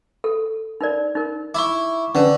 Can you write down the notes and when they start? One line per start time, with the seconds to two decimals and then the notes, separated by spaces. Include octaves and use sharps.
0.24 A4
0.81 D#4 A#4 D5
1.15 D#4 A#4
1.55 E4 C#6 D6
2.15 D3 C#4 D4 B4